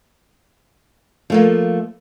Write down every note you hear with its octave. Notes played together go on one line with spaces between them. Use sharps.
F3 A3 A#3